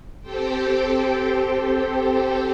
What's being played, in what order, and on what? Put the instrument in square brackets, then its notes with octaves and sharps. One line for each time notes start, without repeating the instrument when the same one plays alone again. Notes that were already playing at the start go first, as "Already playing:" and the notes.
[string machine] C4 G4 A4 C5 G5